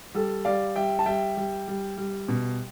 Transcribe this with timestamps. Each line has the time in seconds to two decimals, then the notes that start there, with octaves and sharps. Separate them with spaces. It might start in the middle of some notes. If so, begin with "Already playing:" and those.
0.14 G3 A4
0.45 G3 D5 F5
0.76 G3 E5 G5
0.99 A5
1.06 G3 E5 G5
1.37 G3
1.68 G3
1.97 G3
2.28 B2